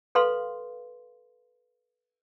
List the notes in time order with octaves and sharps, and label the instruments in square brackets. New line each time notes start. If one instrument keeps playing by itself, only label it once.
[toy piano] A4 B4 F5 C6